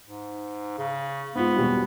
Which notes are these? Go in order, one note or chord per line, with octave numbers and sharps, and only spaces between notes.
G#2
C#3
G#2 B3 F4
E1 B2 G3